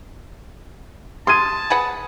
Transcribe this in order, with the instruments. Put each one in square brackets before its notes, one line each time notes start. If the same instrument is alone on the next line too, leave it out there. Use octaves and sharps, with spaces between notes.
[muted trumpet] A5 [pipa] C6 [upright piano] D#6 G#6 D#7
[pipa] G#4 B4 F#5